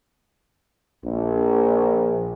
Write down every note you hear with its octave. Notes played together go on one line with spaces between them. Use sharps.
A#1